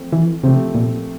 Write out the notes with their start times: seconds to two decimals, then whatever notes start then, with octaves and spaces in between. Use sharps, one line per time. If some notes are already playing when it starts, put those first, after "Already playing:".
Already playing: F3 A3 C4
0.12 E3
0.43 C3 F3 A3 C4 G4
0.75 A#2